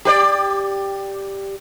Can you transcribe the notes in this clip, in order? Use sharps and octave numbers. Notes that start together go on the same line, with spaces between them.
G4 B4 D5